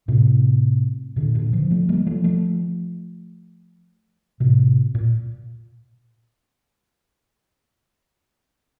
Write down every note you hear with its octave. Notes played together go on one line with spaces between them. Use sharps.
A2 C3
A#2 D3
A#2 D3
D3 F3
F3 A3
G3 A#3
F3 A3
F3 A3
A2 C3
A#2